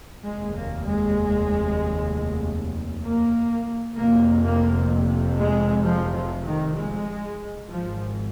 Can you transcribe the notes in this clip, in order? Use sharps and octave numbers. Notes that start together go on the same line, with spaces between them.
F1 D#2 G#3
A#3
G#3
A#3
F1 F2 C3 A#3
A#3
G#3
F3
F3
D#3
G#3
G#1 G#2 F3